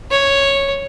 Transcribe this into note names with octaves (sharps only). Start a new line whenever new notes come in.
C#5